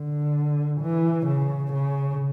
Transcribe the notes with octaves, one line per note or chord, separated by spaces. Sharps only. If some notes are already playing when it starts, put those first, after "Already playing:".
Already playing: D3
E3
C#3
C#3